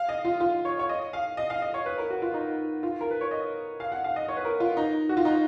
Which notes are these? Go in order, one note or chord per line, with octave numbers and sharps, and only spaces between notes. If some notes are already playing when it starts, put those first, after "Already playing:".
Already playing: F5
D#5
F4
F4
C#5
C#5
D#5
F5
D#5
F5
D#5
C#5
B4
A#4
F#4
F4
D#4
F4
A#4
B4
C#5
D#5
F5
F#5
F5
D#5
C#5
B4
A#4
F4
D#4
F#4
F4
D#4